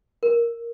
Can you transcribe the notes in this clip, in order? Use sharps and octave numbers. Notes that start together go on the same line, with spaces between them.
A#4